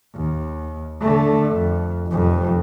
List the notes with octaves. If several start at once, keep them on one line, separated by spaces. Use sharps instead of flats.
D#2
D3 A3
F2
F1 F2